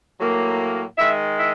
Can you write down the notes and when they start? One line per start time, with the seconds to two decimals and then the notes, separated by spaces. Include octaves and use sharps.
0.18 A2 F#3 A#3
0.98 D#3 G#3 E5
1.39 E5